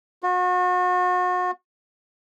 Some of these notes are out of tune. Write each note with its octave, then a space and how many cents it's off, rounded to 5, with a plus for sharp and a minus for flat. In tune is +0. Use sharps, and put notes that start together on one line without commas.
F#4 -35